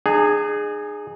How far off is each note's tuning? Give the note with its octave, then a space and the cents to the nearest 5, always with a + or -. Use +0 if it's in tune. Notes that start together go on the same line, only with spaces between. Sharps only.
D#4 -45 G#4 +0